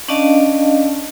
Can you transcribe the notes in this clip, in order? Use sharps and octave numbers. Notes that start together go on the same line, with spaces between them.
C#4 D4 D5 D#5 F5 A5